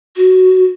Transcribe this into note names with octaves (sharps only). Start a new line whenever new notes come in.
F#4